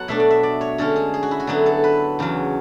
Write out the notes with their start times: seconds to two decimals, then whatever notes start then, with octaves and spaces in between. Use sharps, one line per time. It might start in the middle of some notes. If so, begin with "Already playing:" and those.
Already playing: F#3 B3 F#5 A5
0.08 B2 A3 D4 E5
0.20 D5
0.30 E5
0.43 D5
0.61 C#5
0.78 D3 G#3 C#4 A4
0.96 G#4
1.14 G#4
1.23 F#4
1.31 E4
1.40 F#4
1.47 D3 F#3 B3 G#4
1.66 A4
1.84 B4
2.19 E2 C#3 F#3